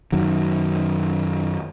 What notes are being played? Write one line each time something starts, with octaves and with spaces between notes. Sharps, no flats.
F#2 D#3 F#3